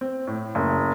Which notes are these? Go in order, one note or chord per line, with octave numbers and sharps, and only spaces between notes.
C4
A2
F#1